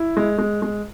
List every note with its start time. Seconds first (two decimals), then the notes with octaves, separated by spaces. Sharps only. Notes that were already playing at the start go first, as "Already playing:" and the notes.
Already playing: E4
0.17 G#3
0.38 G#3
0.62 G#3